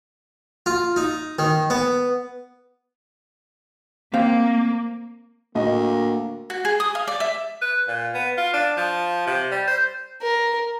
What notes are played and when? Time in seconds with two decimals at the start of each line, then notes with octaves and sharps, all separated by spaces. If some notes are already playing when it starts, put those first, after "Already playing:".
0.66 F4
0.96 D#4
1.39 D#3
1.70 B3
4.13 A#3 C4 F5 G5
5.55 D2 A2 A#3 D#5
6.50 F#4
6.65 G#4
6.80 D#6
6.95 F5
7.07 D5
7.20 E5
7.62 B4
7.88 A#2
8.14 B3
8.38 F4
8.54 D4
8.77 F3
9.27 C3
9.52 G3
9.68 C5
10.22 A#4